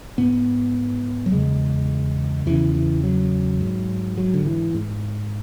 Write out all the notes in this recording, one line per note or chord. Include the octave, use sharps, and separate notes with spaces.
G#2 B3
F#3
E2 C#3 G#3
E2 C#3 E3
E3
F#3
G#2
F#3
D3
E3
G#2